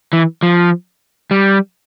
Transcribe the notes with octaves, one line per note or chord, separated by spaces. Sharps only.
E3
F3
G3